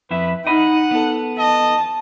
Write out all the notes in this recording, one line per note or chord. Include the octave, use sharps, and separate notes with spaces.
F2 E4 B4 E5
D#4 D#5 F#5 B5
B3 A4
D#5 A5